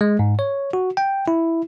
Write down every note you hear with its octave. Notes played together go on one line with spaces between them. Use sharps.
G#3
G#2
C#5
F#4
G5
E4